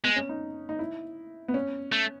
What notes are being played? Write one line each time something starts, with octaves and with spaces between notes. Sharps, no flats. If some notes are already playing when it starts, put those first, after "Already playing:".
G#3 B3
C#4
D#4
D#4
E4
B3
C#4
A3